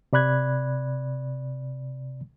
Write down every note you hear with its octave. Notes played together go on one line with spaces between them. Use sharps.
C3 D5 B5 F#6 G#6